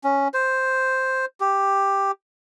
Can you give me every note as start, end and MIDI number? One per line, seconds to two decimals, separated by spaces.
0.04 0.28 61
0.34 1.25 72
1.40 2.11 67